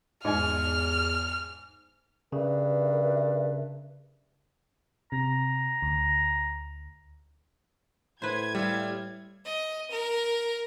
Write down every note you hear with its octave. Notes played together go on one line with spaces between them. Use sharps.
E2 G#2 D#5 G#5 F6
G2 C#3 A#4 B4 E5
C3 A#5
D2
A2 B4 C5 G#6
G3 E5 F5
D#5
A#4